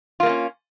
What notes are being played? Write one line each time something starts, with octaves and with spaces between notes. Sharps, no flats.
A3 A#3 C#4 F4